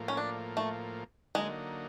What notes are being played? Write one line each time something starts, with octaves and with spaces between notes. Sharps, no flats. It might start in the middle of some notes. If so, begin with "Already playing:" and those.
Already playing: A2 F3 A#3
C#4
D4
A3
D3 F#3 G#3 A#3 D#4